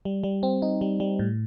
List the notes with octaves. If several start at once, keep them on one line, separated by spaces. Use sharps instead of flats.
G3
G3
C4
D#4
G3
G3
A2